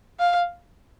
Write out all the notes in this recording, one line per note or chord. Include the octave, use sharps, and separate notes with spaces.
F5